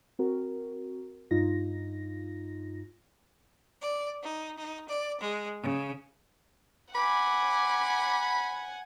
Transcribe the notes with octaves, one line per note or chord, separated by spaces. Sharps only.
C4 F#4 A#4
G2 D#4 F4 A#6
D5
D#4
D#4
D5
G#3
C#3
F#5 G#5 B5 D6